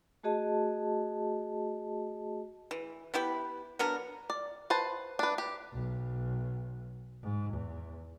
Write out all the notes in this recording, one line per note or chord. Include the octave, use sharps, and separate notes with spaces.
A3 F#4 G#4 D#5 A5
E3
B3 E4 G4 B4
F#3 B3 D4 A#4
D5
B4 C5 A5
D4 B4
G4
B1
G#2
E2